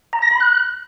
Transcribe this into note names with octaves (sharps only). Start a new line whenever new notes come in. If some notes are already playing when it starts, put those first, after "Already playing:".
A#5
A#6
B5
F#6